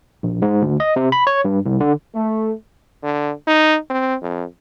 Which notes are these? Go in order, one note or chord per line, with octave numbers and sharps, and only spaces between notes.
A#1
G#2
D2
D#5
C3
B5
C#5
G2
C2
D3
A3
D3
D#4
C4
F2